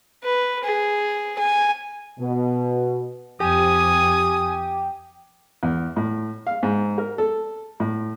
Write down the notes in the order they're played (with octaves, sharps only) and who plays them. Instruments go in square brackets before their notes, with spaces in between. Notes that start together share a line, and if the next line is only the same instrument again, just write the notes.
[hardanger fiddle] B4
G#4
G#5
[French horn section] B2
[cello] F2 [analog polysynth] G4 [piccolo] G#5 [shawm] D#6
[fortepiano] E2
A2
F5
G#2
A#4
A4
A2